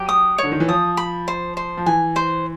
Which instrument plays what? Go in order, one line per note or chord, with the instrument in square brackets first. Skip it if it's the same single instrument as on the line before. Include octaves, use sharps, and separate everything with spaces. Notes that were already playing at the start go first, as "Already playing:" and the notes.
Already playing: [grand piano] F#3 [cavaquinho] G4
[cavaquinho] D#6
C#5
[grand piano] D3
D#3
E3
[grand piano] F3 [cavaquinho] D#6
[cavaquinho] B5
C5
C5
[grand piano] F3
[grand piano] E3 [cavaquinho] G#5
[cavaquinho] C5